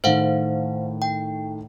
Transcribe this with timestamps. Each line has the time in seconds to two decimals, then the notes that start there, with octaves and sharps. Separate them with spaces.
0.04 A2 D#3 C5 F5 F#5
1.02 G5